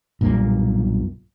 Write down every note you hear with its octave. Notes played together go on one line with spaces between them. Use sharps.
B1 G2 A#2 A#3